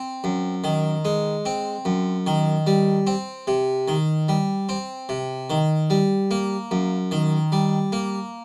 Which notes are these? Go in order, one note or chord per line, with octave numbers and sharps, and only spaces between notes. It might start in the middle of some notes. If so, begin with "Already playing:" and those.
Already playing: C4
F#2
D#3
G#3
C4
F#2
D#3
G3
C4
C3
D#3
G3
C4
C3
D#3
G3
A#3
F#2
D#3
G3
A#3